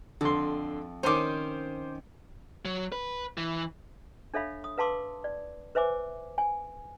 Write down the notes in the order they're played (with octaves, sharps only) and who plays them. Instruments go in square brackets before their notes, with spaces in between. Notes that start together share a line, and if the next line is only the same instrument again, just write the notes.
[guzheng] F2 [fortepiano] D3 C6
[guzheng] D#3 C#4 [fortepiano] C5 C6 D6
[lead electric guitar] F#3
B4
E3
[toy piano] D4 A4 C#5 E5 F5 B5
D#6
B4 F5 A5 C6 D6 E6
D5
B4 C5 E5 G#5 D6
G#5